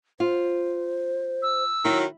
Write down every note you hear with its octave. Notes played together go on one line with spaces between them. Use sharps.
F4 C5
E6
D#3 F#3 E4